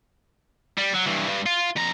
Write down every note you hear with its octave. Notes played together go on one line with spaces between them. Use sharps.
G3
F#3
G2 E3
G2
F4
F2 A#5